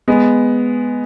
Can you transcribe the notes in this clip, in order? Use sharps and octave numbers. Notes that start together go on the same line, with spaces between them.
G#3 B3